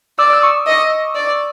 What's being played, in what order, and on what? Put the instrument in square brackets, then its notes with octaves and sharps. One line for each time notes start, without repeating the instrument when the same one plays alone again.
[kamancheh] D5 [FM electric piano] D6 E6
[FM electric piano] E6
C#6 D#6
[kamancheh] D#5
D5